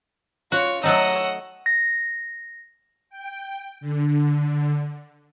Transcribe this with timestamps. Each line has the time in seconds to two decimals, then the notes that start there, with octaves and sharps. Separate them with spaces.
0.52 F4 F#4 C#5
0.83 F#3 A3 D#4 C#5 D#5 F#5 E6
1.66 A#6
3.10 G5
3.81 D3